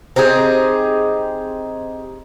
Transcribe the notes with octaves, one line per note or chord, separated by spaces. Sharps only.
C4 D#4 G4 G#4